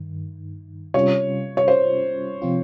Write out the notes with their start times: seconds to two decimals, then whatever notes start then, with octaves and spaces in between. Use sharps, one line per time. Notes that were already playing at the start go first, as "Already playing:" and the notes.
Already playing: G2 D#3
0.94 C3 G3 C#4 F4 C#5
1.57 C#5
1.68 C5
2.42 C3 F3 C4 F4